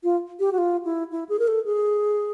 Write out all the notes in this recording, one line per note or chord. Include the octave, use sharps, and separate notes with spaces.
F4
G4
F#4
F4
E4
E4
G#4
A#4
A4
G#4